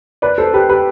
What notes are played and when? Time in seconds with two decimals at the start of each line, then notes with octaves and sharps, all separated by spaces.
0.22 B4 D5
0.38 A4 C5
0.54 G4 B4
0.69 G4 B4